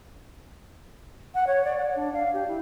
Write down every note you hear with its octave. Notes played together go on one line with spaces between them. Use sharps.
F#5
C#5
D5
F#5
D4
F5
G4
E4